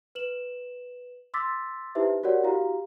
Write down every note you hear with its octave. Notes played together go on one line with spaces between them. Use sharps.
B4 E7 F#7
C6 D6 E6 A6 B6
D#4 E4 G4 B4 C5 E5
F#4 G4 A#4 C#5 D5 F#5
E4 F#4 G4 F5 A#5